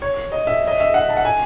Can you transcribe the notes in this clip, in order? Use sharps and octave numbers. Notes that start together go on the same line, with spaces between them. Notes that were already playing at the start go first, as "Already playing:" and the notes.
C#5
D#5
E5
D#5
E5
F#5
A5
F#5
G#5